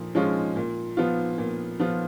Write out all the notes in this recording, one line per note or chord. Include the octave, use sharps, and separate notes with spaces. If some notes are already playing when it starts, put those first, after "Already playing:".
Already playing: A#2 F3
F3 G#3 C#4 F4
A#2
F3 B3 F4
A#2
F3 B3 F4